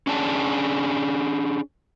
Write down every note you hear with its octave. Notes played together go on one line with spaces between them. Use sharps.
C#4 D4 G#4 A5